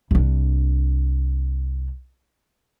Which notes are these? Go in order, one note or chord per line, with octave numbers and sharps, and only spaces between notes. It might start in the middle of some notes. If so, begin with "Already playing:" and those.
C2 D4